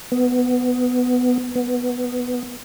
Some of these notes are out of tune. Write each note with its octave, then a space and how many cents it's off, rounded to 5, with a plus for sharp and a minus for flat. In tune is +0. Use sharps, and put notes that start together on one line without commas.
B3 +10
B3 +0